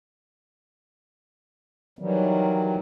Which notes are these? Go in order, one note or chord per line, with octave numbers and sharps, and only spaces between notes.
D#3 E3 F#3 G3